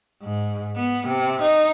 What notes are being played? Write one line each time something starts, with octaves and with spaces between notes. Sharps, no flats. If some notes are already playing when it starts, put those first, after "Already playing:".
G#2
B3
C3
D#4